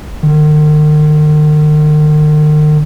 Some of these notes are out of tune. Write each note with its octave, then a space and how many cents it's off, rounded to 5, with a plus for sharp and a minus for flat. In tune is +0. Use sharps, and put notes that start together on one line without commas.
D#3 -45